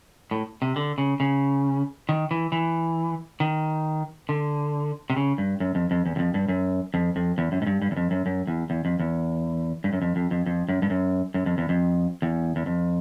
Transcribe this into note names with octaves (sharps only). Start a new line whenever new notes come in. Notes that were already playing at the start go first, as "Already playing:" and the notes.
A2
C3
D3
C#3
C#3
D#3
E3
E3
D#3
D3
C3
C#3
G2
F#2
F2
F2
E2
E2
F2
G2
F#2
F2
F2
E2
F#2
G#2
G2
G2
E2
F2
F#2
F#2
E2
E2
F2
E2
G2
F#2
F2
F2
F2
F2
F#2
G2
F#2
F#2
F2
E2
F2
E2
E2
F2